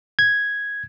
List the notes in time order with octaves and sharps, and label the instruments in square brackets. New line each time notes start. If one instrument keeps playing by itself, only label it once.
[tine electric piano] G#6